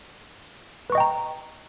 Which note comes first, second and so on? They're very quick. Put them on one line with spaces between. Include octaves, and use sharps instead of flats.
B4 C#6 D#5 G5 A#5